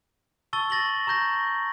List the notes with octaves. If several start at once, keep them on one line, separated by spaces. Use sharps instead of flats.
A5 C#6 E6 A6 G7
A6 A#6 F#7 G7
A#5 C#6 G6 A#6